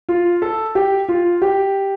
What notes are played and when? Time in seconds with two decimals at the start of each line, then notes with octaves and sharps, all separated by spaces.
0.09 F4
0.42 A4
0.75 G4
1.09 F4
1.42 G4